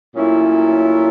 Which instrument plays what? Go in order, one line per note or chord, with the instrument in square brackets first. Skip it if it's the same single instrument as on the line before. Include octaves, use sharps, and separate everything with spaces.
[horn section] A#2 F#3 A3 C#4 E4